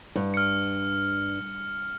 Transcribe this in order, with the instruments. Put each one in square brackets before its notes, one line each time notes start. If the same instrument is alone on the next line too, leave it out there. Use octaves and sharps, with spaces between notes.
[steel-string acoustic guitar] G2
[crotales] F6 C#7